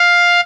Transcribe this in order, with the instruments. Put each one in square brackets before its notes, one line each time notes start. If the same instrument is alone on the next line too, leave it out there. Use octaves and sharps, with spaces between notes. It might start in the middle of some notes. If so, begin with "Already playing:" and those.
Already playing: [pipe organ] F5